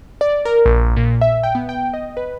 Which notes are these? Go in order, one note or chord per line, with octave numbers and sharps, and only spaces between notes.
D5
A#4
A#1
A#2
E5
G5
B3
G5
D#5
B4